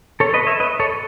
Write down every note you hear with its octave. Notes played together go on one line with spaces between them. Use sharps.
A4 C#5
B4 D#5
C#5 E5
B4 D#5
A4 C#5